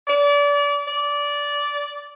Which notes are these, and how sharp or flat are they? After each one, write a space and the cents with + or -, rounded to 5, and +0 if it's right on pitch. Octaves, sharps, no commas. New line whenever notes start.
D5 -30
D5 -15